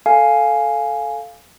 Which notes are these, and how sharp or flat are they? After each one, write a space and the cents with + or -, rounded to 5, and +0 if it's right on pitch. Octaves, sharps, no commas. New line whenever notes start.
A4 +0 F5 +0 G#5 +5